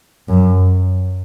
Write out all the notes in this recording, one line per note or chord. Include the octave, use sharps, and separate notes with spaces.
F#2